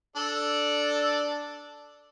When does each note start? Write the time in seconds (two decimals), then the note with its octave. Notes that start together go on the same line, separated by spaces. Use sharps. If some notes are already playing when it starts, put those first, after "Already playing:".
0.16 D4 A4 D5